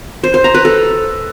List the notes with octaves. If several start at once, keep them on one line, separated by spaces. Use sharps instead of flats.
C5
C5
A#5
B4
A4